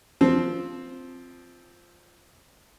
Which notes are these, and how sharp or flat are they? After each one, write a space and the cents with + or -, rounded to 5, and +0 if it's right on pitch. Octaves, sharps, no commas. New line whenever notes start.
F3 +0 C4 +0